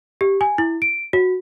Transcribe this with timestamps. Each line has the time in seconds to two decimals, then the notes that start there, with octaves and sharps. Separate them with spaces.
0.21 G4
0.41 G#5
0.58 E4
0.82 D7
1.13 F#4